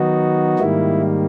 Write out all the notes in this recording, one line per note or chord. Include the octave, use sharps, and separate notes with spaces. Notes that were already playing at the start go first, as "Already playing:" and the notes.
Already playing: D#3 F#3 B3 D#4 F#4
G#2 D#3 G3 A#3 E4